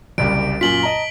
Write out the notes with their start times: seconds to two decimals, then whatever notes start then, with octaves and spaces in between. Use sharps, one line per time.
0.18 F#1 C2 G4 D7
0.61 F#2 A#2 F4 B6 F#7 G7
0.83 D#5 A5 A#5